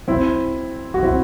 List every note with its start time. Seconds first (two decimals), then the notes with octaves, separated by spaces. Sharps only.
0.08 C4 E4
0.94 F#4
1.03 C4 E4